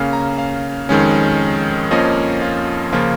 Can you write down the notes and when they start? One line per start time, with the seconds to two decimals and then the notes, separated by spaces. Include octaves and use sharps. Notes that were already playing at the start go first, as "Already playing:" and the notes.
Already playing: C#3 A#3 C#4 F5
0.13 A#5
0.38 F5
0.89 F2 D#3 G#3 C#4
1.91 F2 F3 A#3 C#4 D#5
2.42 F4
2.67 F4
2.93 C#3 F3 A#3 C#4 F4